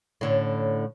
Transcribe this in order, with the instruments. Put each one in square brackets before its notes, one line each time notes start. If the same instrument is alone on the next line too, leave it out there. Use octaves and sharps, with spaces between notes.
[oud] A2 D3 C#4